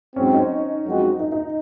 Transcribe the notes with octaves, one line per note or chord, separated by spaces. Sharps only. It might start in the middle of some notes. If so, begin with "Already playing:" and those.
G#2 F#3 C4 C#4
D#4
F#2 F3 G#3 C4 F#4
D#4
D#4